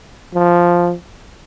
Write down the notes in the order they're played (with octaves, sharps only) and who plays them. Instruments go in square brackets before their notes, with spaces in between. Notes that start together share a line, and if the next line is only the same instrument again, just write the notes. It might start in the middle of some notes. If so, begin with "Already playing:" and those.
[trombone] F3